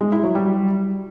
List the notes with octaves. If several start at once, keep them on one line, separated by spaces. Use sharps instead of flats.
G#3
E4
F#3
G3